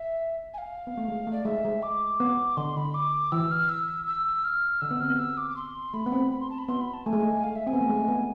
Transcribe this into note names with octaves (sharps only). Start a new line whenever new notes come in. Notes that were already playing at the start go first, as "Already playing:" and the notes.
Already playing: E5
G#5
F5
B3
A3
G#3
A3
D5
G#3 E5
G#3
D6
B3
D3 C6
D3 B5
D6
E3 E6
F6
E6
E6
F6
D3 E6
B3
C4 F6
B3
E6
D6
D6
C6
A3 B5
B3
C4
B5
C6
A5
B5
B3 C6
B5
A5
A3 G#5
G#3
A3
F5
E5
C4 G#5
B3
A3
G#3
A3
B3